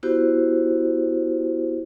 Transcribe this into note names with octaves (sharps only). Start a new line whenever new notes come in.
B3 E4 F#4 G4 C5